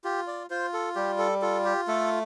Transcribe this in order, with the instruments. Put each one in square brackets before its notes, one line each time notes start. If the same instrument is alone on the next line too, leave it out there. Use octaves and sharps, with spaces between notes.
[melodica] F4 G4
D5
F4 C5
A4
G3 G4
A4
F4 A4
G4
A3 A4